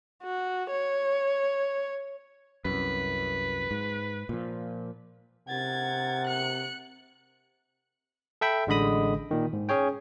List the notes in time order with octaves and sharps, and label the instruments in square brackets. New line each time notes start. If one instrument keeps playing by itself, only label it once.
[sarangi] F#4
C#5
[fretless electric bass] C2 F#2 [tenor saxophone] B4
[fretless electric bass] G#2
A#2 F3
[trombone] C3 [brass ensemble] A#4 F#5 [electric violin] G#6 A6
[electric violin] F#6 C#7
[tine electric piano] A4 E5 G5 B5
A1 D3 G#3 D#5 B5 D#6
A#2 D#3
G#2
C#4 G#4 C#5 G5